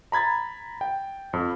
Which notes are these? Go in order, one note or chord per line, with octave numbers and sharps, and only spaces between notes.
A#5 B5 G#6 A6
G5
F2